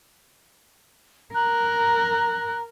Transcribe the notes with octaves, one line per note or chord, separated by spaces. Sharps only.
A#4 A#5 F#6